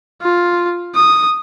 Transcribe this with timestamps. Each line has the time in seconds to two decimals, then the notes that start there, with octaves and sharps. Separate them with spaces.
0.22 F4
0.95 D#6